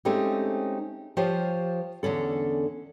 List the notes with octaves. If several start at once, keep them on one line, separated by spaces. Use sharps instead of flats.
G#3 A3 C4 C#4 D#4 G4
F3 F4 G4 C5 C#5
E2 D3 C#4 A4